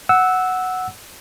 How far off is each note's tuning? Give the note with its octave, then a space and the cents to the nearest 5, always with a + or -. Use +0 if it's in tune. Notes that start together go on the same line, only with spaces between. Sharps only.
F#5 +0 E6 -10